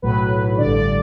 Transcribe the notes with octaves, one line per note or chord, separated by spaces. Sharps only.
B1 A2 F#3 B4
A1 G2 D3 D5
D5